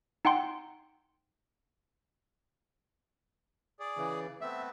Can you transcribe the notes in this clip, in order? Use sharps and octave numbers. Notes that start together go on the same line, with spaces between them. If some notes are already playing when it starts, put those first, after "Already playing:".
D#4 F#5 G5 C6
G#4 D5
C#3 E3
A3 B3 C4 E5